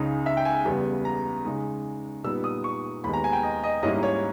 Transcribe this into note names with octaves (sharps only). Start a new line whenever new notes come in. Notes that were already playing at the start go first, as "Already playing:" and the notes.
Already playing: C#2 C#3 G#3 D#4
E5
G5
G#5
E2 C#3 G3 B3
A#5
C#3 G#3 D#4
A#2 G3 B3 D#4 E6
D#6
C#6
D#2 D#3 G#3 B3 B5
A#5
G#5
G5
D#5
D#5
G#2 G3 A#3 C#4 E4 D#5
C#5